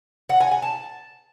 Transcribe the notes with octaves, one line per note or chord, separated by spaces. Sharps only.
F#5
G#5
G#5
A5